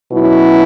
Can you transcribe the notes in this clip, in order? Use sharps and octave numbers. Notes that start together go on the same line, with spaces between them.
B2 F#3 C#4 E4